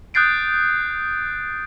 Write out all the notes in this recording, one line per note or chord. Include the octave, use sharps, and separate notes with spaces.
D#6 F#6 G6 A6 C7 D7